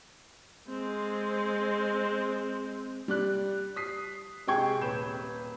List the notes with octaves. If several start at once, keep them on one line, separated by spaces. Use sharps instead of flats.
G#3 C4
G3 D5 F#6
D#6 B6 C7
C3 G#3 G#4 G5 C#6 G#6
D#1 B4 G6 E7